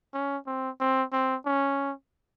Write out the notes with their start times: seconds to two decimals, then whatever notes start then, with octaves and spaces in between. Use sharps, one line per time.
0.14 C#4
0.47 C4
0.80 C4
1.12 C4
1.46 C#4